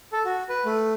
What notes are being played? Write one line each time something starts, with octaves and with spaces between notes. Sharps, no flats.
A4
F#4
B4
A3